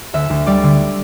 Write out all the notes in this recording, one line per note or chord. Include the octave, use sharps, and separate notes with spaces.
D2 E5
D2
G3 D5
D3